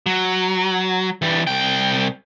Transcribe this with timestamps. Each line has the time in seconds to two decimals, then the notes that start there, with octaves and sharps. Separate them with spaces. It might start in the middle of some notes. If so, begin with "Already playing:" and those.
0.06 F#3
1.22 E3 G3
1.47 C2 G5